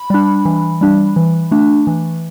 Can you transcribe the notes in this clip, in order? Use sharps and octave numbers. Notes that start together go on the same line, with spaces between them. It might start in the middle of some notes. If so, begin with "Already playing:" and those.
Already playing: B5
G3 D4
E3
G3 D4
E3
A3 D4
E3